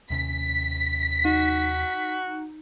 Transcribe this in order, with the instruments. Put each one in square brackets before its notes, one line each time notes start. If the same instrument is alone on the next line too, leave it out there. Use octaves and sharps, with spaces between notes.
[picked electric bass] D#2 C3 C#4 [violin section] B6
[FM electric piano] D#4 [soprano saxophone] F#4